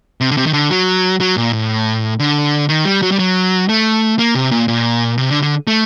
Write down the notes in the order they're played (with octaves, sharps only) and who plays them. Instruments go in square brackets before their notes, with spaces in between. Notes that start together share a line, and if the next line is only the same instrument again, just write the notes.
[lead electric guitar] C3
D3
C3
D#3
D3
F#3
F#3
A#2
A2
D3
D#3
G3
F#3
G3
F#3
A3
A#3
C3
A#2
A#2
C3
D3
D3
A3